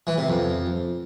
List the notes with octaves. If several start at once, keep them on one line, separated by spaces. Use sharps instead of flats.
E3
C3
F2